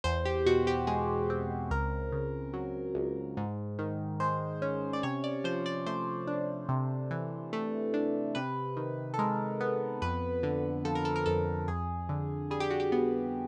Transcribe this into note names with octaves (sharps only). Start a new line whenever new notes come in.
E2 C5
G4
B2 F#4
G4
G#3 G#4
C4
C#2 A#4
C#3
F#3
C#2
G#2
D#3
G#3 C5
C#4
D5
C3 C#5
D5
F3 C5
D5
A3 C5
D4
C3
E3
A3
D4
C3 B4
D#3
A4
G#3 A#4
B3
F2 B4
D3
F3 A4
A#4
A4
A#4
F2 A4
F2 G#4
D3
G3 G#4
G4
F#4
G4
B3